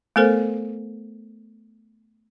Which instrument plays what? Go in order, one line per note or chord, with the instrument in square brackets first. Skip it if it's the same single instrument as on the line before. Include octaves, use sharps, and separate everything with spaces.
[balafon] A3 B3 A4 A#4 C5